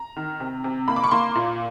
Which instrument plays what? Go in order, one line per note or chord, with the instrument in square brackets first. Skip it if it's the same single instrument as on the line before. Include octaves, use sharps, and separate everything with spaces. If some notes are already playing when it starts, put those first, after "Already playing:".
Already playing: [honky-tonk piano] A#5
D#3
C3
C3
A#3 B5
D6
C#6
A#3 C6
A#2